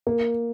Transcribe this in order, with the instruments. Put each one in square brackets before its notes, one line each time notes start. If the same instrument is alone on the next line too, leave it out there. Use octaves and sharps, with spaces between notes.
[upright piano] A#3